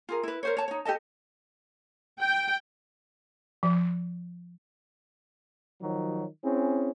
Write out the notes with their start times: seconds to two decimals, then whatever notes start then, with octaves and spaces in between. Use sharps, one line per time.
0.09 F4 G#4 A#4
0.23 E4 B4
0.43 A#4 C5 C#5
0.57 C#5 A5
0.68 D#4 C#5
0.85 G4 A4 D#5 A5
2.20 G5
3.63 F3
5.82 D#3 F3 F#3
6.45 C4 C#4 E4 G#4